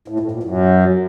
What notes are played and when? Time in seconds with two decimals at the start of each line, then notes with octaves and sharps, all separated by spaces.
0.08 A2
0.20 A2
0.31 A#2
0.43 F#2